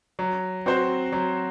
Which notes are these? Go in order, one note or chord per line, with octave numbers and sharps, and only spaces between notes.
F#3
C4 F#4 C5
F#3